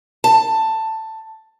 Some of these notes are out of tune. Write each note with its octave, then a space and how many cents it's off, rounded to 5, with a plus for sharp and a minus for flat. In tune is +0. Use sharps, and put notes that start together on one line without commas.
A5 +10